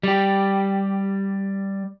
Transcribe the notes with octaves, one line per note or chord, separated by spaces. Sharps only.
G3 G4